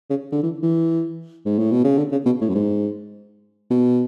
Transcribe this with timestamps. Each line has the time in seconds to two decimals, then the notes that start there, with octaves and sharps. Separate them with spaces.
0.10 C#3
0.32 D3
0.43 E3
0.63 E3
1.45 G#2
1.59 A2
1.71 B2
1.84 C#3
1.97 D3
2.12 C#3
2.26 B2
2.41 A2
2.49 F#2
2.54 G#2
3.70 B2